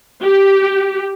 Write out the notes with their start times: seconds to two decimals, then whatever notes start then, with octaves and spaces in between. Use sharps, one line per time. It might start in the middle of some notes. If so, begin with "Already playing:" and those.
0.22 G4